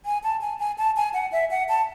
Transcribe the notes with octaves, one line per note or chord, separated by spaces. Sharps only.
G#5
A5
G#5
G#5
A5
G#5
F#5
E5
F#5
A5